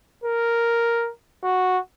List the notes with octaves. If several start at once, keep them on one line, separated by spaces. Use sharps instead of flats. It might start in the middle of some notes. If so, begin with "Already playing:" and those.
A#4
F#4